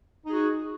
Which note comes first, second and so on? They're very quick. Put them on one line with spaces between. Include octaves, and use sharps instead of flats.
D#4 G#4 F#4